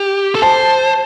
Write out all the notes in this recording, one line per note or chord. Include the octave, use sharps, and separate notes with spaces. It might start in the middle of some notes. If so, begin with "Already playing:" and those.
Already playing: G4
A4
C5 A5